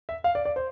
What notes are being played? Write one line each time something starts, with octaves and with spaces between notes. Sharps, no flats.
E5
F5
D5
D5
C5